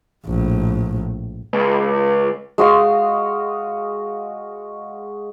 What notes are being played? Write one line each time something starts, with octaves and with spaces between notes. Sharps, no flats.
A#1 A2
C#2
G#3 F#4 D#5 F5